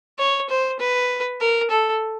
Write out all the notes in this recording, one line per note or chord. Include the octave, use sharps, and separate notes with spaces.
C#5
C5
B4
A#4
A4